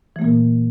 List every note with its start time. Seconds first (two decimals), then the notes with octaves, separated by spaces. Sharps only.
0.16 E3
0.19 A3
0.22 A#3
0.24 A#2